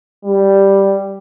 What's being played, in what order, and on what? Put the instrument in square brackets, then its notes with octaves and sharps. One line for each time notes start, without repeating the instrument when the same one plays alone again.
[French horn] G3